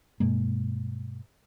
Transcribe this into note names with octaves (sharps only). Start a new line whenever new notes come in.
G2 B2 G#3 A#3